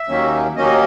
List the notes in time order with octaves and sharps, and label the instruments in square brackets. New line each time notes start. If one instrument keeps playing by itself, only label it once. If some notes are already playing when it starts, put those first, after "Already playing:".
Already playing: [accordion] E5
D#2 D#3 F#3 A#3 C#4
D#2 D#3 F#3 A#3 C#4 D#5